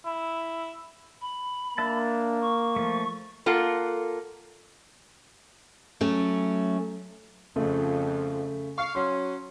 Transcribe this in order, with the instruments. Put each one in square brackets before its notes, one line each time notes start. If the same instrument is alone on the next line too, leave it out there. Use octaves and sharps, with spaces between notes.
[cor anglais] E4
[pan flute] B5
[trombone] A#3 [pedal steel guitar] D4 E5 A5
[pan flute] C#6
[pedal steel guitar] F3 A3
[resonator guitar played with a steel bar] A#3 F4 A4 F#5
[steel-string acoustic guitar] F#3 A3 C#4
[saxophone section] F2 [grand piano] C#3 A3
[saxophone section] F5 [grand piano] C#6
[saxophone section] F#3 C#4 [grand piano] C6